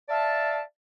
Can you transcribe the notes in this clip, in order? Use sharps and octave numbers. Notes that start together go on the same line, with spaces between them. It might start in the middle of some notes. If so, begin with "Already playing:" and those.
D5 E5 F5 A5